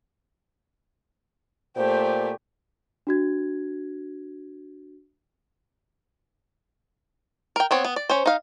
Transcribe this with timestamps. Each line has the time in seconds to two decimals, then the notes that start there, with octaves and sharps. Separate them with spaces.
1.76 A#2 A3 G4 C5
3.07 D4 F#4 G#6
7.56 A#4 G5
7.71 B3 C4 C#5
7.84 B3
7.96 D5
8.09 C#4 C5
8.26 D#4 F5